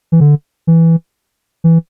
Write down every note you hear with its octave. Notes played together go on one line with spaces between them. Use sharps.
E3
D3
E3
E3